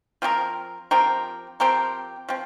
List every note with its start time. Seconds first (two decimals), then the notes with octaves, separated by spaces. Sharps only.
0.22 F3 C4 G4 A#4
0.91 F3 C4 G4 A#4
1.60 F3 C4 G4 A#4
2.29 F3 C4